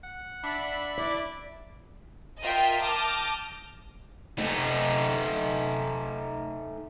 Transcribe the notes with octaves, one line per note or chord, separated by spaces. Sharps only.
F#5
D4 E5 B5
E4 D5
F4 A#4 D#5 E5 G5
A5 D6 D#6 F6 G6 A#6
A3 D#4